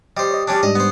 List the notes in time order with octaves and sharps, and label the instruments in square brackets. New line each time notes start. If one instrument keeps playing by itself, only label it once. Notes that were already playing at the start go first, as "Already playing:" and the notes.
[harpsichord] G3 C5 [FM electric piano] D#5
[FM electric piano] C#5 D#5
[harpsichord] G3 C#4 D4
[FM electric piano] G#2 G3 D4 [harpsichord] D#5
[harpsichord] B3 C5